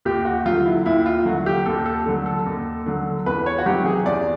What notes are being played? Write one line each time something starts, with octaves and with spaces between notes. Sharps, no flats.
D#2 G4
F#4
D3 F#3 F4
E4
D#2 E4
F4
D3 F#3 F#4
G4
D#2 A4
A4
D3 F#3
A4
D#2
D3 F#3
E2 B4
C#5
F#4
C3 D#3 F#3 G4
G#4
E2 D5